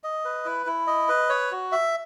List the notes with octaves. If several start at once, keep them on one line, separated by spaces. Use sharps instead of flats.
D#5
B4
E4
E4
D#5
B4
C#5
F#4
E5